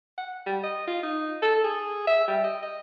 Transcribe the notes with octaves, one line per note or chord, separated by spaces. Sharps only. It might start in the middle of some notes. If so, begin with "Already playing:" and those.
F#5
G3
D#5
F4
D#4
A4
G#4
E5
G3
D#5
D#5